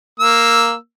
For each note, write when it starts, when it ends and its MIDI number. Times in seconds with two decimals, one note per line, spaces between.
0.20 0.74 58
0.20 0.74 88